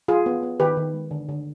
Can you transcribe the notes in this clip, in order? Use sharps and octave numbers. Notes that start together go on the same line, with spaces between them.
F3 F4 G#4
B3
B3
D#3 G4 B4
D#3
G#3
D3
D3